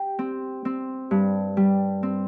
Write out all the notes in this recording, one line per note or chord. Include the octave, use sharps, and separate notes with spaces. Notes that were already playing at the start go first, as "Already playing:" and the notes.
Already playing: G4
C4
C4
G2
G3
C4